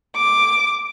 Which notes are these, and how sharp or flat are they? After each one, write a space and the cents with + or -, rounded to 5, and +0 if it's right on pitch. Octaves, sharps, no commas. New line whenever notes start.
D6 +5